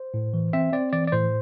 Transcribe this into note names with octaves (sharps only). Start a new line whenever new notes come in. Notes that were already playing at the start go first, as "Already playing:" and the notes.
Already playing: C5
A2
E3
C4 E5
C4 D5
E3 D5
D5
A2 C5